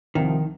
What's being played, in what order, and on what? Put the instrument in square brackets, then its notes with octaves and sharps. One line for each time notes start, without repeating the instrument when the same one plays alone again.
[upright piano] C2 C3 F3 C4 D#4 [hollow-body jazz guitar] D#3